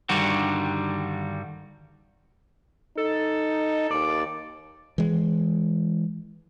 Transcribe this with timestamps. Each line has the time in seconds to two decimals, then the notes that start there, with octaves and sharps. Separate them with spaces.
0.09 G2 D3 D#3 G3 F#4
2.97 D#4 A4
3.91 D#2 D5
4.98 E3 G#3